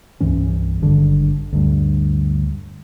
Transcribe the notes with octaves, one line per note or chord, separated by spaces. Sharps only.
C2 G2 E3 C#4
G#1 G2 D3
D2 G2